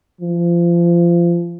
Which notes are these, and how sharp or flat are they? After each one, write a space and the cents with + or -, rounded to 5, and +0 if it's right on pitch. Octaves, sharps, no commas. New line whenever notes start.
F3 -25